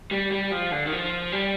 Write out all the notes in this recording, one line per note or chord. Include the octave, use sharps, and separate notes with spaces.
G3
G3
F3
D3
D#3
F3
G3